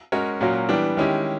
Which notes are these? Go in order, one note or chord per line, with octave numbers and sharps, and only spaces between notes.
G#3 C#4 F#4 A#4 C#5
A#2 F#3 A#3 C#4 F#4
E3 G3 B3 D4
D#3 G#3 C#4 E4 G4